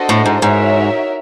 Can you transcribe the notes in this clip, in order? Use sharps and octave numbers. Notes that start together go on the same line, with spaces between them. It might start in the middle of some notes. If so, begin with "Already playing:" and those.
Already playing: D4 F#4 A4 C5 D#5
A2
G#2
G#2 D#4 F#4 A#4 C#5 E5